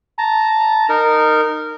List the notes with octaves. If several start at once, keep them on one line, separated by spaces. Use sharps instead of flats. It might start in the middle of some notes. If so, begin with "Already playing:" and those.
A5 A#5
D#4 A#4